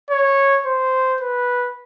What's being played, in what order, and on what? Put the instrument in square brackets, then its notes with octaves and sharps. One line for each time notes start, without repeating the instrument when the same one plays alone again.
[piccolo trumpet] C#5
C5
B4